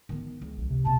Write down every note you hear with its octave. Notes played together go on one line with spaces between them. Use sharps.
D#3 B3
C#2
A#1
C3
C2 B2 A5